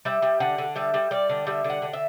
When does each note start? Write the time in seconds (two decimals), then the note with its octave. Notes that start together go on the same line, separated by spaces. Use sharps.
0.05 G3 E5
0.22 G3
0.40 D3 F#5
0.58 D3
0.76 G3 E5
0.94 G3
1.11 G3 D5
1.30 D3
1.47 G3 E5
1.64 D3
1.70 F#5
1.82 D3
1.93 E5